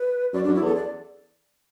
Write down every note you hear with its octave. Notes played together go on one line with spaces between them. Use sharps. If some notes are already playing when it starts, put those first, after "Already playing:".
Already playing: B4
F#2 D5
F#2 D4
E4
E2 A4
D5